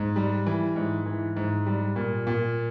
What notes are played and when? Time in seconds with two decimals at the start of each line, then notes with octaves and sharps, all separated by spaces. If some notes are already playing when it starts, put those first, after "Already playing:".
Already playing: G#2
0.16 G3
0.46 E3
0.76 G#2
1.06 E3
1.37 G#2
1.66 G3
1.96 A#2
2.27 A#2